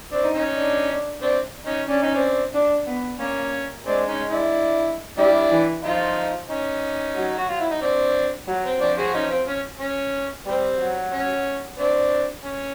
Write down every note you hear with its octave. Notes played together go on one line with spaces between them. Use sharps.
C4 D4
D#4
C#4 D#4
D4
C4 D4
C#4 D#4
C#4 D4
D#4
C4 D4
D4
B3
A#3 C#4
G#3 C4 D4
C#4 D#4
D4 E4
G3 D4 E4
E3
F3 D#4 F4
C#4 D#4
F#3
F#4
F4
E4
D#4
C4 D4
F#3
C4
F3 C4 D4
F#4 G#4
C#4 D#4
C4
C#4
C#4
G3 C4
F#3
C#4
C4 D4
C#4